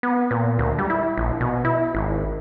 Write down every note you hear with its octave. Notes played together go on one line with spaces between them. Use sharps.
B3
A#2
D2
G3
E4
A#1
B2
E4
G#1